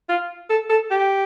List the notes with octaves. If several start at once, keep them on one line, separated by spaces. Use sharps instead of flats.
F4
A4
A4
G4